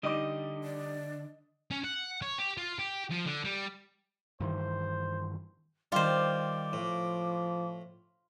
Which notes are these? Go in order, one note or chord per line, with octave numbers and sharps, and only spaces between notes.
D3 G3 D#4 D#5 D6
D5
C#4
F#5
C#5
G4
F4
G4
F3
D3
G3
G2 D#3 E3 C5
D#3 G3 F4 C5 D6
A2 F3